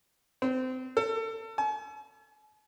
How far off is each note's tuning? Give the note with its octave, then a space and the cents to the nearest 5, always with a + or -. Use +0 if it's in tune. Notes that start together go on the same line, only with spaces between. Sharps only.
C4 -25
A4 +30
G#5 +45